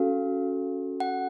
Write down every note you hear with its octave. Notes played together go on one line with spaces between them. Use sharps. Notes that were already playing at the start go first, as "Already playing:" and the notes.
Already playing: C#4 F#4 A4 F5
F#5